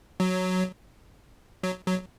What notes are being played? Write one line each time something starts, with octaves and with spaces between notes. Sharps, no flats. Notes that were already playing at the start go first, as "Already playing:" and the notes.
F#3
F#3
F#3